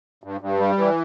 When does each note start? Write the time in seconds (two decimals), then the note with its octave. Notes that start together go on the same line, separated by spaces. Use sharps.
0.24 G2
0.41 G2
0.59 G3
0.78 E3